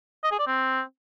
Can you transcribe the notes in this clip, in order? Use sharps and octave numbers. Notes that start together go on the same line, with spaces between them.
D#5
G#4
D5
C4